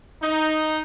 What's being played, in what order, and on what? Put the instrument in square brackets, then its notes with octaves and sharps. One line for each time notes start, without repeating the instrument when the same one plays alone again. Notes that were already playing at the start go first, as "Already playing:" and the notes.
[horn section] D#4